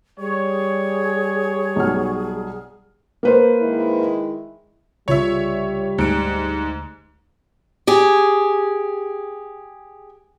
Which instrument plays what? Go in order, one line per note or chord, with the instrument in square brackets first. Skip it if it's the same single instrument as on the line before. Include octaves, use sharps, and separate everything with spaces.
[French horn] G3 [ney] G#4 [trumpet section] C#5
[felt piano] B1 F#3 F6
A#3 B4 C5
[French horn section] D#3 G#3 E4
[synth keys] C2 C#3 F4 [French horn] G3 [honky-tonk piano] C#5 E5
[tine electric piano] D2 [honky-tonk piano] G#2 D7 [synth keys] C#7
[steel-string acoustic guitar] G4 G#4